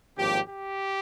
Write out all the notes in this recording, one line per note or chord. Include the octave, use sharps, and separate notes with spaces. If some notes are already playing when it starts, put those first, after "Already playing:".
G#1 G2 F3 A#3 G4
G4